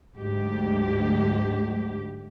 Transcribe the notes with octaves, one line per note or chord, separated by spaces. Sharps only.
D2 G#2 F#3 G4